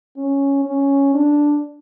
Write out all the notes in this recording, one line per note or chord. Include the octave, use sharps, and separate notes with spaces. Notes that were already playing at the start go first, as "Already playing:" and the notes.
C#4
C#4
D4